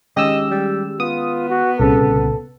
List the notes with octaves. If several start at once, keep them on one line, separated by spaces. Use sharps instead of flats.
D#3 G#3 C#4 G4 D#5 E6
G3
B3 F4 D#6
F#4
C2 A#2 C#3 A4